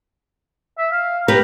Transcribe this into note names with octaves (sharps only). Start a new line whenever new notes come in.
E5
F5
G4 B4 A#5